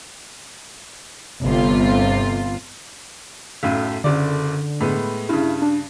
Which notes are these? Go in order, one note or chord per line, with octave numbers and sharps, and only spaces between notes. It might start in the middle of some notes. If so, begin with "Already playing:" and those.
G1 C3 F4
B1 F#2 A2
F#1 F#2 D3 D5
A2 G#3 B3
G2 C#3 E4
D4